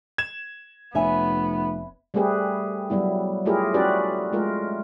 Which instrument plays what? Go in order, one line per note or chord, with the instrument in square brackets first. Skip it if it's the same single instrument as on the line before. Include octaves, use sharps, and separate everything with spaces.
[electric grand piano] G#6 E7
[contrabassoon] F1 [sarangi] B3 [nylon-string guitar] C#5 E5 G#5
[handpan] G3 A3 C4 G4 G#4 B4
F#3 G3 B3 E4
A3 E4 F4 G4 G#4 A#4
C#4 E4 F#4 G4 B4 D5
G#3 A3 F4 A#4